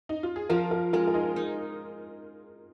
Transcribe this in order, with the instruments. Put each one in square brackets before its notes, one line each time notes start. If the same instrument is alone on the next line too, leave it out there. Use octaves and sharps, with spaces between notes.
[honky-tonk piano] D#4
F4
G#4
[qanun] F3 [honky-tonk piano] F4 A#4
[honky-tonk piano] F4 A#4
[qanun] G#3 [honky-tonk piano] F4 A#4
[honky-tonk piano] A#4
D#4 G#4
[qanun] D#4